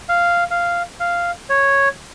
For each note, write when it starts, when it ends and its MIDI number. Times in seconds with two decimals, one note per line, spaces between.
0.09 0.44 77
0.50 0.82 77
1.00 1.31 77
1.50 1.89 73